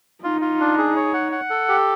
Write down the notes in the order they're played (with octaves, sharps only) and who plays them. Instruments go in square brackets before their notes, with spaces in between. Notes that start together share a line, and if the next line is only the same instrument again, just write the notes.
[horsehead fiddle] D#4 [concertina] F4
[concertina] F4
D4
G#4
C#5
F#5
F#5
A4
G4